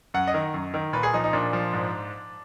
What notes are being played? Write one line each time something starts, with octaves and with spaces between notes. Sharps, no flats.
F#2 F#5
D#5
D#3
F#2
D#3
A#2 B4
G#4
F3 D#4
D#4
A#2 D4
F3
G#2